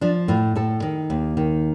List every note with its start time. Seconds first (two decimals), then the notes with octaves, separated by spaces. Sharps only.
0.01 F3 D4
0.28 A2 F4
0.55 A2 A4
0.82 D#3
1.10 D#2
1.37 D#3